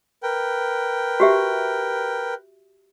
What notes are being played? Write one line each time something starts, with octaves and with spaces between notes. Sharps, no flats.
A#4 B4 G5
F#4 G4 E5